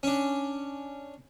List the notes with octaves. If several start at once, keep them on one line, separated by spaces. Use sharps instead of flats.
C#4 D4